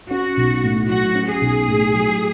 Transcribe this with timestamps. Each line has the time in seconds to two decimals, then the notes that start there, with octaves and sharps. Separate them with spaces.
0.10 C#4 F#4
0.37 B1
0.63 A2
0.89 F#3 F#4
1.15 C#4
1.28 G#4
1.41 B1
1.68 A2
1.94 F#3